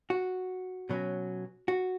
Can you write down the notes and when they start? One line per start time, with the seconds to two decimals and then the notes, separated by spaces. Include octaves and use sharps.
0.10 F#4
0.89 B2 F#3 C#4
1.68 F#4